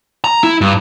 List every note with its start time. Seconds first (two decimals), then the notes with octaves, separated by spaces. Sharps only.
0.24 A#5
0.43 E4
0.61 G2